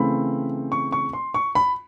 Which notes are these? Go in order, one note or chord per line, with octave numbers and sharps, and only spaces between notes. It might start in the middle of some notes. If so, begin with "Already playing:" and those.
Already playing: C#3 E3 A3 C4 B5
C#6
C#6
C6
C#6
B5